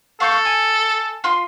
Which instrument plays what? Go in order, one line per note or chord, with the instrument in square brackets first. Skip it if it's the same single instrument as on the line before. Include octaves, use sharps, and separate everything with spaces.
[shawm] A4 [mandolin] F5 C#6 G6
[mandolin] G#5
F4 C6